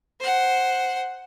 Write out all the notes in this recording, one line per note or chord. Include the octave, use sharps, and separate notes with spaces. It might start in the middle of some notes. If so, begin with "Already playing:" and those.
C5 F#5